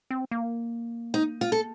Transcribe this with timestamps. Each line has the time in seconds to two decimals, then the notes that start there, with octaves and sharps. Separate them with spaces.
0.11 C4
0.31 A#3
1.14 D#4
1.41 F4
1.52 A4